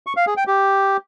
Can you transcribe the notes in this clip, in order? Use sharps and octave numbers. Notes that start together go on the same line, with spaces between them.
C#6
F5
G#4
G5
G4